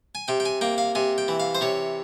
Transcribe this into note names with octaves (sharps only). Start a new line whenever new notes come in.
G#5
C3 G5
G5
G#5
A#3 G5
F5
C3 G#5
G5
E3
F5
C5
C3 C#5